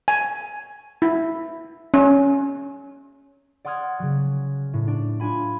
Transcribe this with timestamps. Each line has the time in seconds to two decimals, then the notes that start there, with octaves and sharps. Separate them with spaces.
0.08 G#5
1.02 E4
1.94 C#4
3.65 D5 F#5 C6 D#6 F6 G#6
3.99 C#3 F#3
4.73 A2
4.88 D4
5.20 D4 F4 G#5 B5